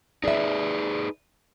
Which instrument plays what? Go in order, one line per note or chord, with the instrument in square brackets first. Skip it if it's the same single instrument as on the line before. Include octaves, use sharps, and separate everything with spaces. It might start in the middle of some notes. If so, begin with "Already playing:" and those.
[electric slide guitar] D#4 G#4 B4 [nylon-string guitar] D5 E5